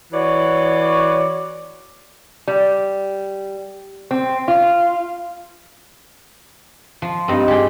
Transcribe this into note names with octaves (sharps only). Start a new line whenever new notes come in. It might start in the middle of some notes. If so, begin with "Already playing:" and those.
E3 F#4 C#5 D5
G3
C4
F4
F3
G2 C4 D#4
G4 G#4 D5 G5